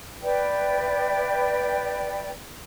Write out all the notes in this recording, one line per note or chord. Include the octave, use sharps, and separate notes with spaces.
B4 D5 E5 G5